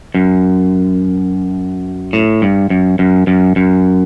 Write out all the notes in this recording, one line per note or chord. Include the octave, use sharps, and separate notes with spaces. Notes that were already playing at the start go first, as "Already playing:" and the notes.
F#2
A2
G2
F#2
F#2
F#2
F#2